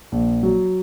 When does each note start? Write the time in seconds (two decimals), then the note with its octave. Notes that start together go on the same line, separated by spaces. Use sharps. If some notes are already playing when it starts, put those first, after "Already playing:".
0.12 A#1
0.43 F#3